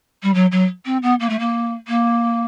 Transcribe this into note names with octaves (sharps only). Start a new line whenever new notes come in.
G3
F#3
F#3
C4
B3
A#3
A3
A#3
A#3